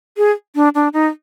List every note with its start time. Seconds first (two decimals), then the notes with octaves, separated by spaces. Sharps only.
0.17 G#4
0.55 D4
0.75 D4
0.93 D#4